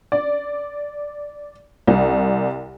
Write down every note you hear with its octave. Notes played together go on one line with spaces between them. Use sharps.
D5
C2